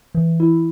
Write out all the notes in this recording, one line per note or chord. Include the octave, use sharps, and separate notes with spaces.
E3
E4